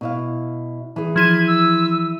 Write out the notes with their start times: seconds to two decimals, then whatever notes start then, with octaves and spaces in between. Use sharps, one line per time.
0.01 B2 E4 F5
0.96 E3 G#4
1.16 F3 E4 G#6 D#7
1.47 E6